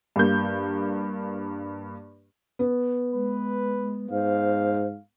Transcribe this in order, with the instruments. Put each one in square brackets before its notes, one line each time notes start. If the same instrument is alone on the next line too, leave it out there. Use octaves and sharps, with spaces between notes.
[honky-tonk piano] G2 A#3 G6
[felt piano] B3
[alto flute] G#3 [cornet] B4
[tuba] G#2 [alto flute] C5 [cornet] F5